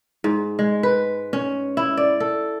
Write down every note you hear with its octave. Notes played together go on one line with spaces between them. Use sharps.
G#2
G#3
B4
C#4
E4
D5
A4